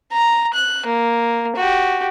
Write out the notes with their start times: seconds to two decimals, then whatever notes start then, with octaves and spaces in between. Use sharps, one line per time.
0.12 A#5
0.54 F#6
0.86 A#3
1.56 F#4 G4